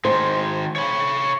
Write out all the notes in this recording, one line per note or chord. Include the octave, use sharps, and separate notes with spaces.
D#3 G#3 C5
C#5 B5